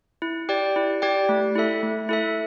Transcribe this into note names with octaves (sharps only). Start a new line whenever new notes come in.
E4
G4 D5 G5
E4
G4 D5 G5
A3
E4 A4 E5
A3
E4 A4 E5